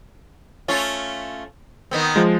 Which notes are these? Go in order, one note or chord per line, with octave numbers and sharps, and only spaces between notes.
A3 C#4 F4
D#3 B3 C4
F3 G#3